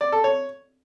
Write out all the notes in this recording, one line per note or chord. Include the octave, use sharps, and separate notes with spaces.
D5
A4
C#5